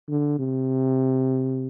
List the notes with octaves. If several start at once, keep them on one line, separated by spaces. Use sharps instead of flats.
D3
C3